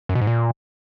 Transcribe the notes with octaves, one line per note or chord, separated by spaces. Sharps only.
F#2
B2
G#2
A#2